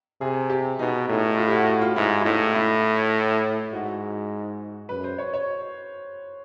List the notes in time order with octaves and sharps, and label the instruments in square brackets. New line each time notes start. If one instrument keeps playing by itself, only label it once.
[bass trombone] C3 [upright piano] G#4
[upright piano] G4
[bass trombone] B2 [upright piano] D#4
[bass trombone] A2 [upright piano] D#4
[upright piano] F4
G4
F#4
F#4
F4
[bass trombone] G#2 [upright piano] E4
[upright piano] E4
[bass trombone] A2 [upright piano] D#4
[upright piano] E4
[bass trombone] G#2 [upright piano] F#4
[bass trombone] F#2 [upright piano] B4
[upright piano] C5
C#5
C#5